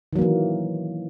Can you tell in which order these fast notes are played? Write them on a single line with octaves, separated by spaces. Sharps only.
D#3 F#3 A#3 E3